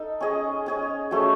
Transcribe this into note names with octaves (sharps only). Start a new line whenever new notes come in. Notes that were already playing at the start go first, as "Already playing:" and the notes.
Already playing: D#4 A4
C#4 G#4 D#5
C#4 G#4 D#5
F#3 A3 C#4 G#4